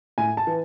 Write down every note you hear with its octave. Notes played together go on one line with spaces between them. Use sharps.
A2 G#5
A5
E3